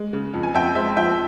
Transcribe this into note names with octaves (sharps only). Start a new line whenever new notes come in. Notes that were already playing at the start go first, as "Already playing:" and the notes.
Already playing: G#3
C#3
F2
G#5
F2 E5 G5
G#3 C5 E5
F3 E5 G5